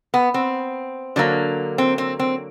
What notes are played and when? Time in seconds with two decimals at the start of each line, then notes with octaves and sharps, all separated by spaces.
0.14 B3
0.34 C4
1.16 D3 F#3 A#3
1.78 C4
1.98 C4
2.19 C4